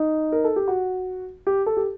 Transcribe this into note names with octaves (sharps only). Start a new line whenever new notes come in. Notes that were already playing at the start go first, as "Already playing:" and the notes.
Already playing: D#4
A#4
A4
G4
F#4
G4
A4
G4